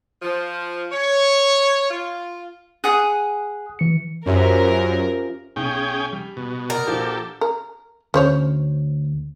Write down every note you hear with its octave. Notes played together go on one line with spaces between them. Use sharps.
F3
C#5
F4
G#4 F#5 D#6 F#6
E3 C#7
F#2 F3 C#4 G4 A#4 E5
B1 C#4 G#4 G5
G3
B2
A#4 D5 F#5 D#6
A#1 F3 F#4 G4 A4
A#4
D2 C#4 C5 C#5